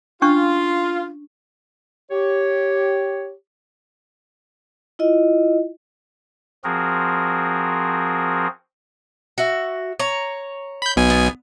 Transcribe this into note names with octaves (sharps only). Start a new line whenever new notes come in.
C#4 D4 F4 C#6
G4 C#5
E4 F4 D#5
F3 C4 F#4 G#4 A#4
F#4 E5
C#5 A#5
B5 G6
B1 B2 G#5
B3